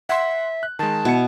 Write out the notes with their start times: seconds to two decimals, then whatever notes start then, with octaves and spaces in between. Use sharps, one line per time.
0.09 E5 F#5 C6
0.63 F#6
0.79 D#3 G#3 A5
1.05 B2 E4 C#7